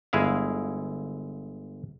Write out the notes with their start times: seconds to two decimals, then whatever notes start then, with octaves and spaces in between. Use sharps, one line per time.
0.13 G1 G#3 E4 G#4 F5